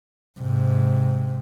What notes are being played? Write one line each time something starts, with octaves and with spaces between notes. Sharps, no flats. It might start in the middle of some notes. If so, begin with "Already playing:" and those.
G#2 C3